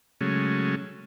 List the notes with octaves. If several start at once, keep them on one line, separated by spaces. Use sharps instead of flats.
C#3 F#3 G#3 A3 C#4